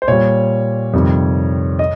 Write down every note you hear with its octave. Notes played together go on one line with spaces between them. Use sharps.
C5
A#2 G3 C#5
F2 C3 D#3 G3
D#5